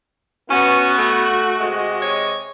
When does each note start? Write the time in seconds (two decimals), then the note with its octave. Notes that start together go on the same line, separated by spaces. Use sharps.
0.50 B3 C#4 F#4
0.98 A3
1.60 C3 G#3 D#5
2.02 C#5